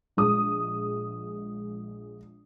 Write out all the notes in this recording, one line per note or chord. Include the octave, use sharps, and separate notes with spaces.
A#1 G#3 D#6